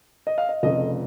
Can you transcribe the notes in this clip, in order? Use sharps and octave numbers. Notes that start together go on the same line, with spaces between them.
D#5
F5
D#5
F1 F2 C#3 D#5